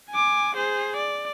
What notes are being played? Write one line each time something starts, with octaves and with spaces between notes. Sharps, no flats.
G#5 D6
G#4 C5
D5